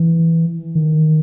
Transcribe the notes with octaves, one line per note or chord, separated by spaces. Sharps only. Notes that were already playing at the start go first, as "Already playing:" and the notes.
Already playing: E3
D#3